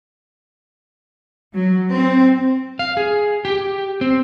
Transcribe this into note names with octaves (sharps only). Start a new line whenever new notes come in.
F#3
C4
F5
G#4
G4
C4